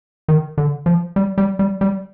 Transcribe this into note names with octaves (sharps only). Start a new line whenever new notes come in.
D#3
D3
F3
G3
G3
G3
G3